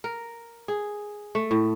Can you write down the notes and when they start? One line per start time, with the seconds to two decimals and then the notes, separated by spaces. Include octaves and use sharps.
0.04 A#4
0.68 G#4
1.35 A3
1.51 A2